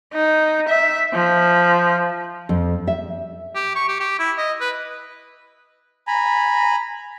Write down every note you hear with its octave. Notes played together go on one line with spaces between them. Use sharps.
D#4
E5
F3
F2
E5
G4
C#6
G4
G4
E4
D#5
B4
G#5 A#5 B5